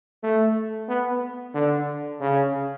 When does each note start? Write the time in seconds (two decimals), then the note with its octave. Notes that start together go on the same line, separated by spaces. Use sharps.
0.23 A3
0.89 B3
1.55 D3
2.21 C#3